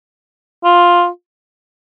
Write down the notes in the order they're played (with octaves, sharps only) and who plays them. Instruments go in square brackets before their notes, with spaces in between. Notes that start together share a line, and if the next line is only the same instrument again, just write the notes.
[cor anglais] F4